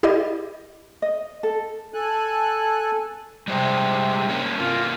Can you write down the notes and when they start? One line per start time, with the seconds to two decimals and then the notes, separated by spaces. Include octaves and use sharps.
0.03 E4 G4 G#4 D5 D#5
1.02 D#5
1.43 A4
1.94 A4 G#5 F#6
3.48 C3 G3 G#3 C5
4.29 A#3 C#4
4.58 C3 A#3 F4